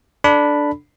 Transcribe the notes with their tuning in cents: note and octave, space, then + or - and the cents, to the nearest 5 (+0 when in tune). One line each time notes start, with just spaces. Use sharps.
D4 +0 A4 +0 B5 +0